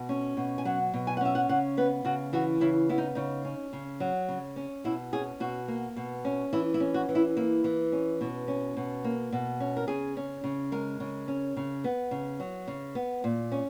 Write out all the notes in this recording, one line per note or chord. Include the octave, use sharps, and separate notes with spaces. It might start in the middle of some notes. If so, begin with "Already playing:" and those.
Already playing: B2
C#4
B2
G#5
F#3 F#5
B2
G#5
F#5
C#4 E5
F#5
C#3 F#5
B3 B4
C#3 F#4
E3 F#4
C#3 E4
B3 E4
D#4
C#3 D#4
C#4
C#3
F#3
C#3
C#4
B2 E4
C#4 G#4
B2 F#4
A#3
B2
C#4
E3 E4
E4
C#4
F#4
E3
E4
A#3 E4
E3
C#4
B2
C#4
B2
A#3
B2
C#4
A#4
C#3 G#4
C#4
C#3
G#3 A#4
C#3
C#4
C#3
B3
C#3
F#3
C#3
B3
A#2
C#4